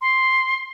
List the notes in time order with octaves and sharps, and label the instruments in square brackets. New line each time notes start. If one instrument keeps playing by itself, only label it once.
[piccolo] C6